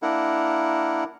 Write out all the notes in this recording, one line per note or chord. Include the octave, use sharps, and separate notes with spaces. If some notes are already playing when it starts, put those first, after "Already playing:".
A#3 D4 E4 A#4 F#5